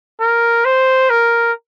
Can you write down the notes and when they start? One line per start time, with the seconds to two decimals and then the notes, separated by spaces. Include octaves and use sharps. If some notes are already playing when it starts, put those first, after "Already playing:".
0.20 A#4
0.65 C5
1.10 A#4